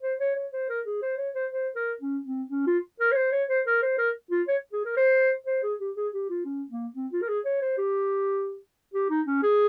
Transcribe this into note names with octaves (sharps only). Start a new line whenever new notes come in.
C5
C#5
C#5
C5
A#4
G#4
C5
C#5
C5
C5
A#4
C#4
C4
C#4
F4
A#4
C#5
C5
C#5
C5
A#4
C5
A#4
F4
C#5
G#4
A#4
C5
C5
G#4
G4
G#4
G4
F4
C#4
A#3
C4
F4
A#4
G#4
C#5
C5
G4
G4
D#4
C#4
G#4